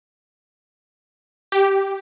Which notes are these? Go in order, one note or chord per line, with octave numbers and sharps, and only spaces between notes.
G4